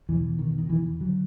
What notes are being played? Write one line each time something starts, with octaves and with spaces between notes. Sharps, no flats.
E2 B2 E3
D#3
D#3
E3
D3 F#3